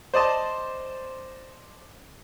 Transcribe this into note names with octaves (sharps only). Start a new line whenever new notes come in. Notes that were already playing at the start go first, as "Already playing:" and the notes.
C5 D5 D#5 A5